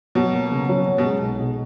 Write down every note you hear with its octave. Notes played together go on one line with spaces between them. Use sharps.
B2 F#3
A#3
C#3
F#3
C#4
B2
G#3
B1
B2